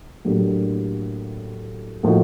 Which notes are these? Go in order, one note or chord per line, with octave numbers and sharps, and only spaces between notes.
A2 F#3 A#3 D4 G4
A2 F3 A#3 D#4 F#4